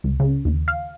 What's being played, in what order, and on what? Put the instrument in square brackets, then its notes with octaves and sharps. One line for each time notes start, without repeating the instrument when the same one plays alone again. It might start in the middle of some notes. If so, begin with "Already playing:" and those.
[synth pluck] C#2
C#3
D#2
F5